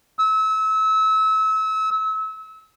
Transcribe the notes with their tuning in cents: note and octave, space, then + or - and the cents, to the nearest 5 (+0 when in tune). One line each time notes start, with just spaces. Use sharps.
E6 -30